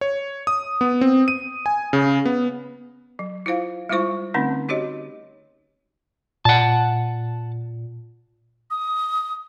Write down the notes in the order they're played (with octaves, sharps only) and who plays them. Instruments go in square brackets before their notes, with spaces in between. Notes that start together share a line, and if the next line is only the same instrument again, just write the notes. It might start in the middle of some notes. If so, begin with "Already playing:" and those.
[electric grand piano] C#5
D#6
B3
C4
D#7
G#5
C#3
B3
[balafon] F#3
E4 F4 C5 F5
G3 G#3 E4 F4 C5 C#6
D3 A3 C4 C#4 D#4
D#4 F#4 G4 C#5 D#5
[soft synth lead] A#2 [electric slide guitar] F#5 A5
[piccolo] D#6